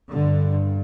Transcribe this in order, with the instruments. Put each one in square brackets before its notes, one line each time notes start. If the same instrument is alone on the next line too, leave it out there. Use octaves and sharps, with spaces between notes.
[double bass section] G2 D3